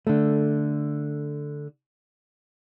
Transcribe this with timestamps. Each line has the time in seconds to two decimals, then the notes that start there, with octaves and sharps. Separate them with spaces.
0.07 D3 A3